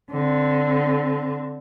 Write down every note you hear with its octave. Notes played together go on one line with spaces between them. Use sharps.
D3 C4